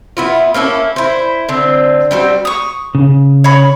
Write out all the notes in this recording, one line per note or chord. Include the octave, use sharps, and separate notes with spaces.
B3 E4 F4
A#3 C#4 E4 A4
E4 C5
D3 C4
G3 A3 C4 F#4
C#6 D#6
C#3
C#5 B5